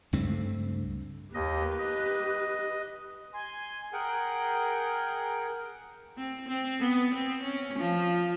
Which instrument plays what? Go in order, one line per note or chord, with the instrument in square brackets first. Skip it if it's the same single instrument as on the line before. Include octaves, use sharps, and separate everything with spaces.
[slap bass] C#2 G2 A3 C4
[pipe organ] D#2 D#5 [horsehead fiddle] G4 B4
[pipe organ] D#5
[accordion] G#5 C6
G#4 A#4 F#5 G5
[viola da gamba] C4
C4
B3
C4
C#4
F3